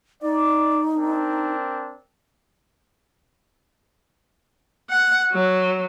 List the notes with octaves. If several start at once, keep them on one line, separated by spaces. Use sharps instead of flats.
D#4 D5
C4 D4 A#4
F#5
F#3